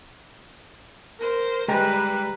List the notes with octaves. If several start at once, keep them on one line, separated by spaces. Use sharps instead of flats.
A#4 C5
G3 G#3 B4 G5 A#5